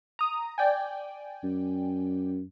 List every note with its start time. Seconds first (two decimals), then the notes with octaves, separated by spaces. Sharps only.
0.19 A#5 D#6
0.58 D5 G5 G#5
1.44 F#2